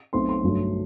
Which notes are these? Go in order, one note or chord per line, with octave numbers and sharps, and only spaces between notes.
B1 B2 A3 C4 C6
C6
G1 G2 F#3 A3